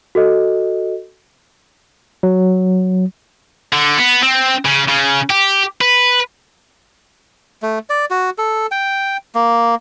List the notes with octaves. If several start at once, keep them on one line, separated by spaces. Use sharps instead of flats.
F#4 A4 D#5
F#3
D3
B3
C4
C#3
C#3
G4
B4
A3
D5
F#4
A4
G5
A#3